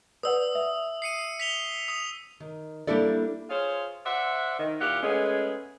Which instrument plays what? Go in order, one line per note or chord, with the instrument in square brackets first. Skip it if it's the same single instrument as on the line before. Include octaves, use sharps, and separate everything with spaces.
[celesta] B4 D5 F#5 [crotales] D#6 E6
[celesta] E5
[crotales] C7 C#7 D#7
B6 F7 G7
D#6 F7
[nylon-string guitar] D#3
G3 A#3 D4 E4 A4 D5
[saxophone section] F4 G#4 C5 C#5 F5
C5 D5 E5 F#5
D#3
A#2 E4 G4 F5 F#5
G#3 A3 B3 C#4 G#4